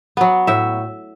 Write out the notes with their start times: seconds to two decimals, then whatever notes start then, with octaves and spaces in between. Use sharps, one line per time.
0.17 F#3 B3
0.47 A2 E5